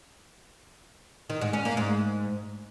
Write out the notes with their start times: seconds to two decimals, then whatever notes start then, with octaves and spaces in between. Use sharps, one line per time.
1.30 D#3
1.41 G#2
1.53 C#4
1.65 A#3
1.77 G#2